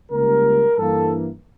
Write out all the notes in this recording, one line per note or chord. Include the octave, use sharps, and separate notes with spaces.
C#2 C#3 G3 A#3 A#4
G2 E3 A#3 A4